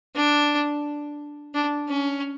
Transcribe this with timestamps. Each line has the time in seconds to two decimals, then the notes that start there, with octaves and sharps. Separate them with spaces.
0.15 D4
1.54 D4
1.89 C#4